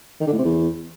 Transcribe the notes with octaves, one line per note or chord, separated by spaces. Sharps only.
D#3
D3
A2
C3
E2